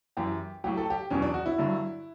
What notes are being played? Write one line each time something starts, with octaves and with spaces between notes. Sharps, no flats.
F#2 E3 G4
A2 F#3 G4
A4
G4
E2 B2 F#3 C#4
D4
F#4
E4
G2 D3 F#3